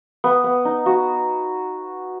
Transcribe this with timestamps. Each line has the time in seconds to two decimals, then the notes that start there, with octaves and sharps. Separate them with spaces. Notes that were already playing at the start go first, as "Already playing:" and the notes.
0.24 B3
0.44 B3
0.65 D#4
0.86 F#4